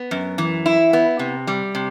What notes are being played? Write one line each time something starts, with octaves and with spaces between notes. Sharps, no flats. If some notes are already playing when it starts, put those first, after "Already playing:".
Already playing: B3
F#2
E3
E4
B3
C3
G3
C3